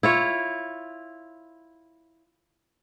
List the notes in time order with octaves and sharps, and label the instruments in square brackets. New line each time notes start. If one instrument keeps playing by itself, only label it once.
[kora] E4 F4 C#5